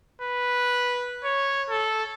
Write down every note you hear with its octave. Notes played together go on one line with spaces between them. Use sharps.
B4
C#5
A4